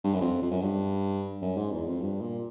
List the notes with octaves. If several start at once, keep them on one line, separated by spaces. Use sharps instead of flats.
G2
F#2
F2
F2
F#2
G2
F#2
G#2
E2
F2
G2
A#2